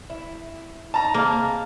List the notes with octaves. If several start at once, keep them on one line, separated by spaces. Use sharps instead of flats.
E4
D#4 A5 A#5
C3 G#3 A#3 F5